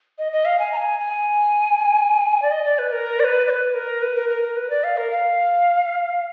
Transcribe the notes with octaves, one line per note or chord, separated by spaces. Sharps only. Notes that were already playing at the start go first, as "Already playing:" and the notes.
D#5
D#5
F5
G#5
A#5
G#5
G#5
D5
D#5
D5
B4
A#4
D5
B4
D5
B4
A#4
B4
A#4
A#4
A#4
B4
D5
F5
A#4
F5